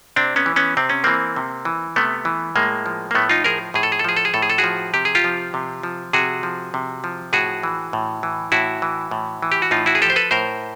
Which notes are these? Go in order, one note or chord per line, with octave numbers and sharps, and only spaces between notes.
C3 C4 D4
B3 C#4
E3
B3 C#4
C3 C4
C#4
E3 A#3 C4
C3
E3
C3 A3 B3
E3
A2 G#3 A#3
F3
A#3
A2 A3 B3
D#4 F4
F3 G#4 A#4
A2 G#4
A4
G#4
A4
F3 G#4
A4
G#4
A2 A4
G#4
A4
F#4 G#4
F3
C3 G4
G#4
F4 G4
F3
C3
F3
C3 F#4 G#4
F3
C3
F3
A2 F#4 G#4
E3
A2
E3
A2 E4 F#4
E3
A2
E3
G4
F#4
A2 D#4 F4
E4 F#4
G#4
F3 G4 A4
C5
A4 B4
A2 A#4 C5